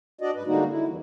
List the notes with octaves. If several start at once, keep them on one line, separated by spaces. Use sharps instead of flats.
D4 F#4 D5 D#5
G#2 B4
D3 G3 G#3 A#3 D#4 F#4
E4
D#2 E3 G3